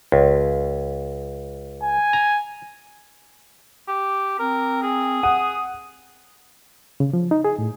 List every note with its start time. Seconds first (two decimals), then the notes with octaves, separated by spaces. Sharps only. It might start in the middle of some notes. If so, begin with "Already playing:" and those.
0.12 C#2
1.83 G#5
2.13 A#5
3.88 G4
4.40 C4 A#4
4.83 G#4
5.23 F#5 D#6
7.00 C#3
7.13 F3
7.31 D#4
7.45 G#4
7.59 A2